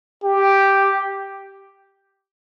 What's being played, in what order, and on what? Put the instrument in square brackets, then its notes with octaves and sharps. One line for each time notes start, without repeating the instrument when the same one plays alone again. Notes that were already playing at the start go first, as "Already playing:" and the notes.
[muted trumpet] G4